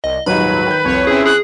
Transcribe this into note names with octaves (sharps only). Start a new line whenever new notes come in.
C2 D#5
D#1 G#2 F#3 G3 D#4 B4 B5
D#3 G6
C2 F2 C#5
C4 C#4 E4 G#4
G#4 F#6